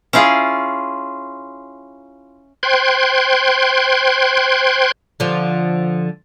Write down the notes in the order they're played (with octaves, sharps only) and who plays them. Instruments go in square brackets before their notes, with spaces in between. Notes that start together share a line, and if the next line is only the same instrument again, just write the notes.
[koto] C#4 E4 F4 G#4
[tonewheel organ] C5 G5 C6 F#6 G#6
[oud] D3 F3